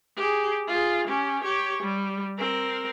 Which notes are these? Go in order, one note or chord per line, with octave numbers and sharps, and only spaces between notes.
G4 G#4
F4 G#4
C#4 G4
G4 C#5
G3
C4 A#4